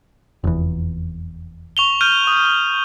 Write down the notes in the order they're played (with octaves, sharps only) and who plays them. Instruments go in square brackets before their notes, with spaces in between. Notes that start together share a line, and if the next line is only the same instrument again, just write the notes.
[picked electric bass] F1 E2
[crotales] C#6 F7 G7
F6 G6 D#7
D#6